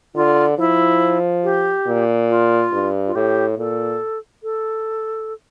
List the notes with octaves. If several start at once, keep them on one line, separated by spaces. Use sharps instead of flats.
D3 F4
F3 E4
G4
A#2
F4
G2
F4
A2 G4
A#2 A4
A4